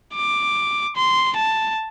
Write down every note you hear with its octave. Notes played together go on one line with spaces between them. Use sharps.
D6
C6
A5